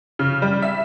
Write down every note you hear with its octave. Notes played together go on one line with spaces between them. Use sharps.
C#3
G3
E5